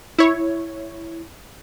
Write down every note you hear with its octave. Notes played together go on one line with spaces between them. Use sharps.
E4 C#5